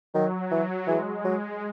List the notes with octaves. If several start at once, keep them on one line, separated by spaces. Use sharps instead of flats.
D#3 F#3
E3
E3 G#3
F#3